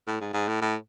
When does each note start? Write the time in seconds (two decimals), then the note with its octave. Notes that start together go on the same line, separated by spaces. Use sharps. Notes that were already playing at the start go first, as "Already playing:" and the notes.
0.07 A2
0.21 G#2
0.34 G#2
0.48 A2
0.61 A2